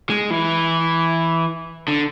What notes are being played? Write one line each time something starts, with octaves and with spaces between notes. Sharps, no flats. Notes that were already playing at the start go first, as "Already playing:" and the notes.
G#3
E3
D3